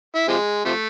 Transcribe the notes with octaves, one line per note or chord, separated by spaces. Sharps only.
E4
C3 F3 G#3
C3 F3 A3